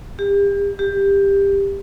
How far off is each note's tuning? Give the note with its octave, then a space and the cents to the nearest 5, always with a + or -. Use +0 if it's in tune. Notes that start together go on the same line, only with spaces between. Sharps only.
G4 +35
G4 +15